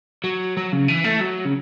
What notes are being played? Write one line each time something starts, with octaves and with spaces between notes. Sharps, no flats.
F#3
F#3
C#3
E3
A3
F#3
C#3